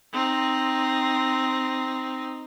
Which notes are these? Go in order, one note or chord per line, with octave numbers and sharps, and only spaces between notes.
C4 D#4